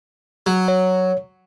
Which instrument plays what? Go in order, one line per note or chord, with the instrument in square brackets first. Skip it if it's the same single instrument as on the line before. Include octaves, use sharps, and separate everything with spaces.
[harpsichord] F#3
[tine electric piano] C#5